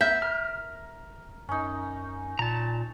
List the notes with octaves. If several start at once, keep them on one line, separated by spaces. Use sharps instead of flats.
B3 A#4 E5 G6
A#4 F6
F#2 C#4 D#4
A#2 A5 A#5